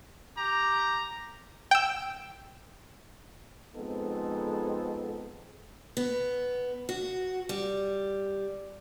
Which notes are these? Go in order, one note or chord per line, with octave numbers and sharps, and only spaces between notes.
G4 A#5
G5 E6
F2 G#3 B3 C4 D#4 A4
B3
F#4
G3